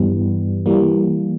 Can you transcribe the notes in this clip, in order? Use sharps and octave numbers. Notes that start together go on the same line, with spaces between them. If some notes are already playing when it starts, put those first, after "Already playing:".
Already playing: G2 E3 G3 B3
E3 G3 A#3